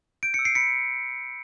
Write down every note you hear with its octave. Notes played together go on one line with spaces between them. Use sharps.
G6 D7
E6 C#7
C7 D7
B5 B6 C#7